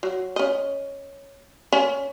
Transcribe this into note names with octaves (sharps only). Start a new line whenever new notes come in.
F#3
C#4 D#5
C#4